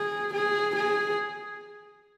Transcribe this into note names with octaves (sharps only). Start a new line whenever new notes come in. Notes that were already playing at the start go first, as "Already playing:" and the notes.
Already playing: G#4
G#4
G#4